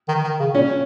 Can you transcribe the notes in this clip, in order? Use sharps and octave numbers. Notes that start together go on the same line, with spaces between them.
D#3
D#3
C#3
A#2 C#4